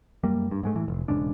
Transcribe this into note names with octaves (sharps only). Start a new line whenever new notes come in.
F#2 G3 A#3
G2
G#2 G#3 A3
A2 E3
F1
E1 G#2 C#3 D4